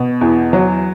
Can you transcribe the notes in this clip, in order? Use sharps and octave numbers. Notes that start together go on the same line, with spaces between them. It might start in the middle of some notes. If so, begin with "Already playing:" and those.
Already playing: B2
E2
F#3